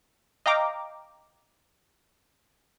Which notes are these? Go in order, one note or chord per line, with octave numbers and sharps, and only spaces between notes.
D#5 F5 G5 A#5 D6